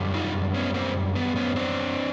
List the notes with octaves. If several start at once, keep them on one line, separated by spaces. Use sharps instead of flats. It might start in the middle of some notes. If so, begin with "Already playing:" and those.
Already playing: F#2 D3 G3
D#4 F4
B3 C#4
A#3 C4
B3
B3 C#4
C4 D4